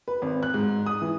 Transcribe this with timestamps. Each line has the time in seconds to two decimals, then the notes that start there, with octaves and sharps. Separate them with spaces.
0.08 B4
0.22 G#1
0.43 F#6
0.54 G#2
0.86 D#6
1.02 E3